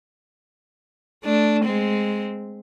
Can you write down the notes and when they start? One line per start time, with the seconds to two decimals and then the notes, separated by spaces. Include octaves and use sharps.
1.24 A3 D4
1.65 G#3 C4